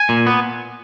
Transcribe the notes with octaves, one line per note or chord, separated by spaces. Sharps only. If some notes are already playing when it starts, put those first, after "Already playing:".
Already playing: G#5
A#2
B3